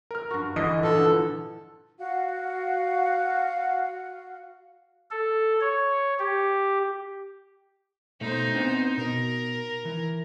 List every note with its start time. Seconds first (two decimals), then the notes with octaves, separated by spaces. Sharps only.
0.11 A#4 F6
0.30 G2 F#4
0.56 D3 E3 D#5
0.83 A#2 B3 A4
0.95 D3
1.99 F#4 F5 F#5
5.11 A4
5.61 C#5
6.19 G4
8.21 B2 A3 D#4 C5
8.53 B3 C4 D4
8.97 B2 A#4
9.85 E3